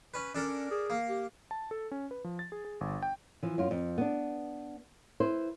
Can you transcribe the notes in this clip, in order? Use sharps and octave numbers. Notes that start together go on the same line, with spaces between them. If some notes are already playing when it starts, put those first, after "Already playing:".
C#4 B4
C#4 D4 A4 A#4
G#4
A#3
G4
A5
A4
C#4
B4
F3
A6
G#4
G#4
G1
G5
E3 F3
F#2 F4
F2
B3 D4
E4 B4 C5